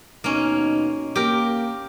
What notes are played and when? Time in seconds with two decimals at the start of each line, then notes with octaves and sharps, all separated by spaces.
0.24 D#2 B2 A#3 C#4 D#4
1.15 A#3 G4 A#4